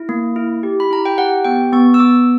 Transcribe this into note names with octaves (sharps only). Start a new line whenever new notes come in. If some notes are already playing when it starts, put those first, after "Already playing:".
Already playing: E4
A#3
E4
G4
B5
E4 A#5
G5
G4 F#5
B3 G5
B3 C#6
E6
B3 D6